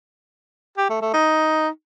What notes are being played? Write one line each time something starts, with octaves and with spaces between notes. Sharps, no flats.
G4
A3
A3
D#4